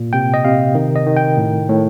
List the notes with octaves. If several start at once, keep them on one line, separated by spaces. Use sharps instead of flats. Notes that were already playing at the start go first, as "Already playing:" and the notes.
Already playing: A#2
C3 G5
D#5
C3 F5
D#3
D#5
D#3
G5
A2
A2